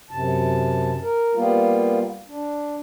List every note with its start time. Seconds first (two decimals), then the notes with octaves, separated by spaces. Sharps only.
0.11 F#2 C3 A5
1.01 A#4
1.35 G3 A#3 B3 F4
2.28 D4